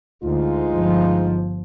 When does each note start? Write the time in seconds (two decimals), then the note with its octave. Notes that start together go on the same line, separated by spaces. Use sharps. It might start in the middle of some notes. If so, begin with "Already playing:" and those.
0.23 D2 G#3 D#4 F4
0.71 G1 F3